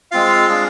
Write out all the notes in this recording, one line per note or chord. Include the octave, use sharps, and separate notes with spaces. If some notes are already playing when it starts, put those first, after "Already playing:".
G#3 C4 F4 F5
G#3 D4 G#4